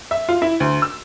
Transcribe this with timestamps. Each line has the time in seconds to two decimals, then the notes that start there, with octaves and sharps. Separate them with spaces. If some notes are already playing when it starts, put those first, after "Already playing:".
0.11 E5
0.29 F4
0.42 E4
0.60 D2
0.82 E6